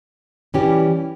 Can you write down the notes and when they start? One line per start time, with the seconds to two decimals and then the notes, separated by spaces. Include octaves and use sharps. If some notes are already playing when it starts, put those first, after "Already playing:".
0.54 E3 G3 C#4 G4